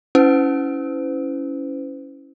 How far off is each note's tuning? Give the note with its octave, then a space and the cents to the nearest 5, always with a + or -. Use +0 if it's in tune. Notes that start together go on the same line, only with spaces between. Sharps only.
C#4 +0 E4 -10 C5 -45